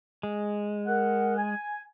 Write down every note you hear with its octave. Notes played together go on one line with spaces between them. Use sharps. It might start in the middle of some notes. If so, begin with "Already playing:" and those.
G#3
A#4 F#5
G#5